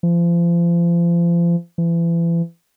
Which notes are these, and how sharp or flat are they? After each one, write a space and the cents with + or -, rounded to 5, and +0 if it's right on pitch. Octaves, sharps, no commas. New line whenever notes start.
F3 -35
E3 +35